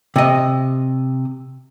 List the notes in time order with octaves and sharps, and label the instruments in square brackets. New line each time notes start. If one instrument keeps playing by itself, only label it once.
[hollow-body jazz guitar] C3 D#5